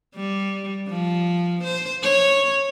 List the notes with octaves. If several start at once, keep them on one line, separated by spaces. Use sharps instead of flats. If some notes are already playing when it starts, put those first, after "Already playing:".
G3
F3
C5
C#5